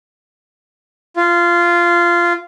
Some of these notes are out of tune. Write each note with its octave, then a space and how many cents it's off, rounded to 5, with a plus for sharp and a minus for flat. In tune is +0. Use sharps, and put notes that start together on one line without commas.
F4 -15